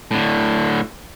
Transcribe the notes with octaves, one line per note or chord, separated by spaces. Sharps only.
A2 D3